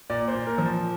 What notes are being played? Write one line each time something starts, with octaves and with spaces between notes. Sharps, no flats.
A#2 D5
C5
A#2
A#4
F3